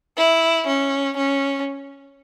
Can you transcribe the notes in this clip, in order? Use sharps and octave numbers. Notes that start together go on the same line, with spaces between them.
E4
C#4
C#4